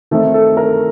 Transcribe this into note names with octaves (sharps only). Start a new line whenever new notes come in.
D#3 A3 C4 A4
A4
A#4